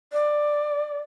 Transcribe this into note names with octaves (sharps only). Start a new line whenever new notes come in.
D5